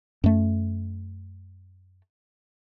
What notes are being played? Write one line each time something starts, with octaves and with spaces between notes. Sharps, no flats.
F#2 A3